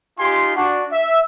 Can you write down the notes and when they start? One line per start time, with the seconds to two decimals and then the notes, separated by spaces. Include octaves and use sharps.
0.19 D#4 F4 G4 G#5 C6
0.56 D4 F#4
0.92 E5